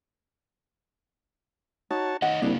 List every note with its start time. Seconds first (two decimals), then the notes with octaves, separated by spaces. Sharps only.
1.91 D#4 F#4 C#5 A5
2.22 D#3 D#4 C#5 D#5 F#5
2.42 C2 C#3 A#3 D4